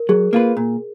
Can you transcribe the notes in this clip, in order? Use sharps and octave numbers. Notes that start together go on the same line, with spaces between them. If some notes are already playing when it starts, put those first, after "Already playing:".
Already playing: A#4
F#3 G#4
A#3 F4 B4
A#2